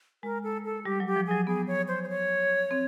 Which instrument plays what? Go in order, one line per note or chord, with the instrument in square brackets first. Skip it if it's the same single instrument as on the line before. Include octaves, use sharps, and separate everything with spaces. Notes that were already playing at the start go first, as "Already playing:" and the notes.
[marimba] G#3 [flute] A#4
[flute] A4
A4
[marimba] G3 [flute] G4
[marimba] F#3
[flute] G4
[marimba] F3
[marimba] F#3 [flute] G#4
[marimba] B3 [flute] G#4
[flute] C#5
C5
C5
C#5
[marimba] C4